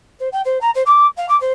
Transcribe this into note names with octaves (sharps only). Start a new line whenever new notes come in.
C5
G5
C5
A#5
C5
D6
F5
D6
C5